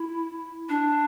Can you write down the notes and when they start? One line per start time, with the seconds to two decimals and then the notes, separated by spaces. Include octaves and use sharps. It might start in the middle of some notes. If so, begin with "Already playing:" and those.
Already playing: E4
0.69 D4